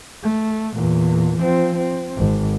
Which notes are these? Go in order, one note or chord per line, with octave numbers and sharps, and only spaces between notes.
A3
E2 A#2
F3 C4
C4
G#1